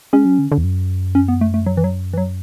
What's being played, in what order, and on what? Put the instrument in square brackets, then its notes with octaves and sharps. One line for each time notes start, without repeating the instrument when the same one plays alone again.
[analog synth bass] G#3 [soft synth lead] C#4
[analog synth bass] F#3
D3
D3
E2
F#2
[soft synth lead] C#4
B3
A3
A3
F#3
E3
F#3
E3
F#3